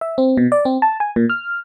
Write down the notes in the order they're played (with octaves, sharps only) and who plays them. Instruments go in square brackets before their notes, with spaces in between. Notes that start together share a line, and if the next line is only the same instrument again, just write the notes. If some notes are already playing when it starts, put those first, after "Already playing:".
[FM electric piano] E5
C4
B2
D5
C4
A5
G#5
A#2
F6